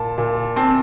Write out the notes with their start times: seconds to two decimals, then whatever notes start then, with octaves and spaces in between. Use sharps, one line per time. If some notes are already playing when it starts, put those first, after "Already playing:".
Already playing: A#2 A5
0.18 A#2
0.56 C4 A5